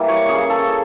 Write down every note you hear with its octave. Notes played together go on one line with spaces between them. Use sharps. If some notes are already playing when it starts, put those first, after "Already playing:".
Already playing: E3 G3 A#3
C#5
C#3 G#4
A4